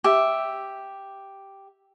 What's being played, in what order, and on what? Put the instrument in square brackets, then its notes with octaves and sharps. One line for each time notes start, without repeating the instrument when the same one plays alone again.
[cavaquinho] G4 E5